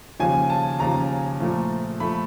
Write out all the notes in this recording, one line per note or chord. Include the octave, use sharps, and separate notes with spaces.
D#2 C#3 F3 G#5
A5
D#2 C#3 F3 A#5
A#2 F3 A3
A#2 F3 A3 B5